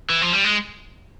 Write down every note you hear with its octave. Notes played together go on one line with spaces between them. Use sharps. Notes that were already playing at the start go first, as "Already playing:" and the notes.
E3
F3
G3
G#3